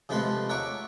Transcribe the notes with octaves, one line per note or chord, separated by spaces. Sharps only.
C3 F3 G#3 A3 B4 C6
C#5 E5 F#5 A#5 C#6 D6